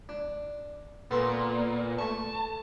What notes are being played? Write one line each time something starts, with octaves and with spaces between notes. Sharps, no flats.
D4
A#2 B3 A4 C6
A3 A5 C#6